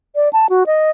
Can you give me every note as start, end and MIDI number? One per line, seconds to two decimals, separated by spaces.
0.15 0.29 74
0.33 0.47 81
0.49 0.64 66
0.66 0.91 75